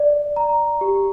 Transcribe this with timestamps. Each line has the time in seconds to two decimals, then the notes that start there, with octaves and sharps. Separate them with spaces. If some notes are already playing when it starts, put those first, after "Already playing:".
Already playing: D5
0.36 A#5
0.81 G4